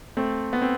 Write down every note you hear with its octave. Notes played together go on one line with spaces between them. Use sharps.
A3 C4
B3
C4